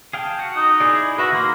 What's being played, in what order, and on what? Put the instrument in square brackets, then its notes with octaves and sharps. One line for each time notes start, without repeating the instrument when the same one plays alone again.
[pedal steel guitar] G#4 F5 G5 [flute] A5
[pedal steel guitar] F#4 F#5
[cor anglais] D#4 [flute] D#6
[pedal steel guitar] E4 G#4 D5
[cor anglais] F#4 [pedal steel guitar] B4 E5 [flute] A#6
[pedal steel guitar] D#3 A#4 B5 [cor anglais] A#3 [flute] C6